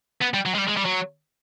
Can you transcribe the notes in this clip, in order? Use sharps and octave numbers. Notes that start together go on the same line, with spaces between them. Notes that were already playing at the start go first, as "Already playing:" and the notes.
B3
G3
F#3
G#3
G3
G#3
G3
F#3